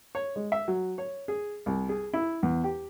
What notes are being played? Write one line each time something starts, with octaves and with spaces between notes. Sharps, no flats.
C#5
G#3
E5
F#3
C#5
G#4
C2
G#4
E4
E2
G4